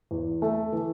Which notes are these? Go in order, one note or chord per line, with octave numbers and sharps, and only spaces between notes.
E2
A3
E3